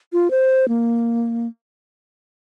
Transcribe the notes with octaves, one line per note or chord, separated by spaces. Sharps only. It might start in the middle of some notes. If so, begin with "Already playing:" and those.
F4
C5
A#3